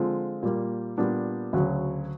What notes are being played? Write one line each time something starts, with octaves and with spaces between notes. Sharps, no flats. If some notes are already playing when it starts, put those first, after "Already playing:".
Already playing: D3 F3 G#3 C4 F4
A#2 G3 A#3
A#2 G3 B3 D4
D2 C#3 F#3